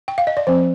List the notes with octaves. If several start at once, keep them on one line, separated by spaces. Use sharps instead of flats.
G5
F5
D#5
D5
F3 C4 C5